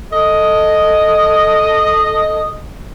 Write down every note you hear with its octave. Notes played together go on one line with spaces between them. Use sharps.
A4 D#5